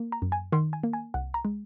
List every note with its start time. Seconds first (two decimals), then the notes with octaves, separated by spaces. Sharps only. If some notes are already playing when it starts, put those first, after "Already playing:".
Already playing: A#3
0.12 A#5
0.22 F#2
0.32 G#5
0.53 D#3 C6
0.73 G#5
0.84 A#3
0.93 G#5
1.14 C2 F#5
1.34 A#5
1.45 G#3